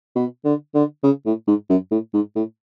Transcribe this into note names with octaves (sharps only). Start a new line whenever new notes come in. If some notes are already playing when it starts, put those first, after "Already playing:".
B2
D3
D3
C#3
A2
G#2
F#2
A2
G#2
A2